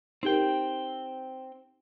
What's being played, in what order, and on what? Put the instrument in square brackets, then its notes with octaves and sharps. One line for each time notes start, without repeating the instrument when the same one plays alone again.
[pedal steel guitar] C4 G5 [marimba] D#4 G4 A#4